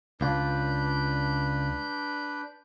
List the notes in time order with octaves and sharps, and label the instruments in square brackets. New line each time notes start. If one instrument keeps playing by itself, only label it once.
[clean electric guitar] C#2 F4 [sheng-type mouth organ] D4 B4 G6